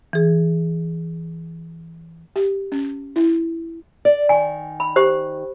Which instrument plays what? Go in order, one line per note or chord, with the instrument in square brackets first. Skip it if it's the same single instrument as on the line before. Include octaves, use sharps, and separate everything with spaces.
[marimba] E3 G#4
[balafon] G4
C#4
E4
[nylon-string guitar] D5
[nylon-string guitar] D#3 [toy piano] G#5
[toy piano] B5
G4 C5